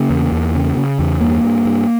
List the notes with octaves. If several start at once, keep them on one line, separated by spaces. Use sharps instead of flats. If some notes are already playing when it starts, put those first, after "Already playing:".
Already playing: C#3 A#3
E2
E2
C#3
C#3
E2
G2 A#3
G2
G2